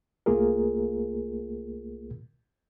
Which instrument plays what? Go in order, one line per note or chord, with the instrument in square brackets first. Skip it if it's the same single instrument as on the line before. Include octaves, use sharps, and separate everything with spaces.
[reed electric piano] C2 A3 A#3 F4 G#4 A#4